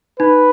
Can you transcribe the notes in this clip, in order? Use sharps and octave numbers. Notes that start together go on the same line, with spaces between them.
D#4 B4